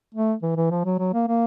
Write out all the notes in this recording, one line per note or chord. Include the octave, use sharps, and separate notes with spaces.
A3
E3
E3
F3
F#3
F#3
A#3
A#3